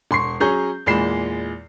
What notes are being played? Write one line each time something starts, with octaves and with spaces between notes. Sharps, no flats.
E1 C6 C#6 C7
F#3 C#4 G#4 A#5 C#6 G6
E2 A#2 G#3 B5 C7 E7